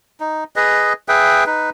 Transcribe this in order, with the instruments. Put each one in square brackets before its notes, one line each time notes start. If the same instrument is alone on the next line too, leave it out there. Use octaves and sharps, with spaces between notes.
[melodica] D#4
G#4 B4 D#5
G#4 B4 E5 G5
D#4 B4